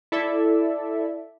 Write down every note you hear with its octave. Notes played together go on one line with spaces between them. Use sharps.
E4 A4 D5 E5